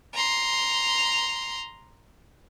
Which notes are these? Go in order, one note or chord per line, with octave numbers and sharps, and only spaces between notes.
A#5 C6